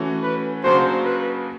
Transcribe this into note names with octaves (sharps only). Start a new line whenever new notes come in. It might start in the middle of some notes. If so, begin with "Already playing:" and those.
Already playing: E3 A3 C#4 F#4
B4
C#3 F#3 A#3 D4 F#4 C5
B4